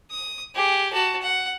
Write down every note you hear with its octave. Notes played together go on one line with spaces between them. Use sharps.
D#6
G4 G#4
F#4 A5
F#5